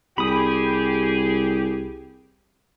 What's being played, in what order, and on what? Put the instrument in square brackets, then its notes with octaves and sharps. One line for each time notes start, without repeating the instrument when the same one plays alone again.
[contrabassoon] C2 [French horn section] G4 G#4 [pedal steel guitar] B5 D#6